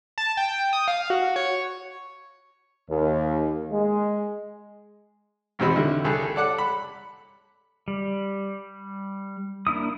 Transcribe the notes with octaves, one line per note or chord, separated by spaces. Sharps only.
A5
G5
D#6
F5
F#4
C#5
D#2
G#3
G#1 E2 B2 C4 F#4 B5
D3 G3 E4 F#4
C2 G#4 A4 F#6
A4 D5 F#5 D6
B5
G3
A#3 D4 E4 D#6